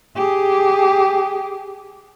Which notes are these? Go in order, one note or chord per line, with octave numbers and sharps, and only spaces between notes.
G4 G#4